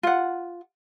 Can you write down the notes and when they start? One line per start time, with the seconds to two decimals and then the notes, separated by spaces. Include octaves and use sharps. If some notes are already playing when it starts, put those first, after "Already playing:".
0.03 F4 F#5